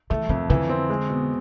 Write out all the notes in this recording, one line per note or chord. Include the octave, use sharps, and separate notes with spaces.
E3 A3
F2 D#3
D3 E3
C4
G#3
B2